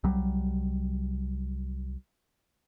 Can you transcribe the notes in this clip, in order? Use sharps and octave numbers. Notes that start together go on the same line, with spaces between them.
C2 F#3 G3